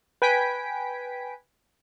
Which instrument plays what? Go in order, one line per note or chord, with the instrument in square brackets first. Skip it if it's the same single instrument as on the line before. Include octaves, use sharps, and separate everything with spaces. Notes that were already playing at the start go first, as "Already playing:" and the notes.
[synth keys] B4 G5 G#5 B6 D7